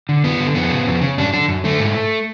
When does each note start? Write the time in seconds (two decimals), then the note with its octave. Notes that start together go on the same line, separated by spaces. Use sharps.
0.09 D3
0.24 F#2 B3
0.40 D3
0.55 F2 B3
0.70 C#3
0.87 F2
1.01 C#3
1.18 F#2 D4
1.33 D3 D4
1.48 F#2
1.64 D3 A3
1.80 G#2